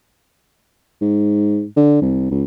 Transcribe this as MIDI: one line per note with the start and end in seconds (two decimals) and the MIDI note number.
1.01 1.65 44
1.77 2.02 50
2.02 2.28 36
2.31 2.44 37